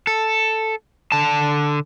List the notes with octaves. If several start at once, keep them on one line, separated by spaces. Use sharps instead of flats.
A4
D3 A5